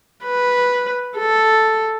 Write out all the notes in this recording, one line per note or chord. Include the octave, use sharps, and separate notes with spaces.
B4
A4